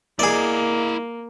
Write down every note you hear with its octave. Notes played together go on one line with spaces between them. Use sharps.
A#3 E4 G#4 D5 D#5